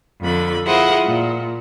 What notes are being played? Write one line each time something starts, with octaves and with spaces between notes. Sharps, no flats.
F2 D3 B5
E4 F4 G#4 A#4 C5 F#5
A#2